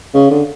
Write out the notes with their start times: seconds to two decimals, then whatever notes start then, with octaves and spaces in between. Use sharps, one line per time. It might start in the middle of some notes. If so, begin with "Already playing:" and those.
0.14 C#3
0.31 D3